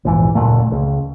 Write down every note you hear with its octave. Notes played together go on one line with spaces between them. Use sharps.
A#1 E2 G#2 E3
F#1 D2 A#2 A3
C#2